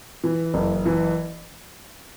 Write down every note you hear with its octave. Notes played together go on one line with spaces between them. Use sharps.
E3
F#1
E3